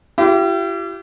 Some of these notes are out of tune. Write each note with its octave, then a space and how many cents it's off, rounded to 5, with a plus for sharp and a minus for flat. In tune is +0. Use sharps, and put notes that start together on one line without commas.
E4 +45 G4 -25